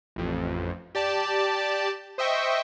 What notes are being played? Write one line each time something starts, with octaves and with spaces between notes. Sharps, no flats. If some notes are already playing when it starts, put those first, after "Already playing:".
A1 F2
G4 D5 A5
C5 D#5 E5 G5 C#6